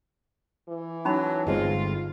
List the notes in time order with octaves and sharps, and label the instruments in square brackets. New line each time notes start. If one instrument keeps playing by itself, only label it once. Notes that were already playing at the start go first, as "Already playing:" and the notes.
[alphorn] E3
[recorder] F#3 [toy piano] C#4 D#4 B5
[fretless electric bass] G1 G#3 C4 [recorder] F4